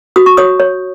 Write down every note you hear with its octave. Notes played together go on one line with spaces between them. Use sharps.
F#4 D#6
C#6
C#5 D#6
C#5